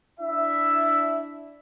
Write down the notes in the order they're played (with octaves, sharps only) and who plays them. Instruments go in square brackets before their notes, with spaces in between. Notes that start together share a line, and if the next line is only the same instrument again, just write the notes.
[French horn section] D4 E4 [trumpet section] E5